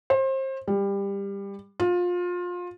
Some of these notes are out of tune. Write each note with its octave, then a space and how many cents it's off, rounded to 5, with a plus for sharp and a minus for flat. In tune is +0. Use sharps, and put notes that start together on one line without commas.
C5 +30
G3 +20
F4 +25